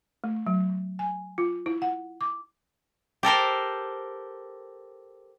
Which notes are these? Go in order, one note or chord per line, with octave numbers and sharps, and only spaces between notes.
A3
F#3
G#5
F4
E4
F#5
D6
G4 A4 A#4 C5